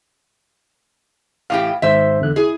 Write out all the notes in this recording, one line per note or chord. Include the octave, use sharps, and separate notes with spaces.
A2 E3 G4 F5
G#1 G#2 C5 E5
E2 D3 F#6
E4 G#4